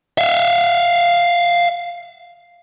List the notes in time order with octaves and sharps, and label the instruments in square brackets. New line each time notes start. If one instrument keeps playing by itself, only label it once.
[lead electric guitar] E5 F5